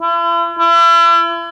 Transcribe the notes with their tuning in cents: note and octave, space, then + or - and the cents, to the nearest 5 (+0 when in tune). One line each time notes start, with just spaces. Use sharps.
E4 +45
E4 +40